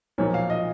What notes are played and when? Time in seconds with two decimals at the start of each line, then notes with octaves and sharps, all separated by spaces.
0.18 B1 A#2 F3 A#3 C#5
0.34 F5
0.50 D#5